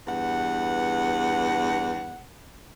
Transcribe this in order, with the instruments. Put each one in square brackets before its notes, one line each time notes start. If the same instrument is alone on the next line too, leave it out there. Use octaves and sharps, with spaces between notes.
[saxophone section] E2 G2 B4 F#5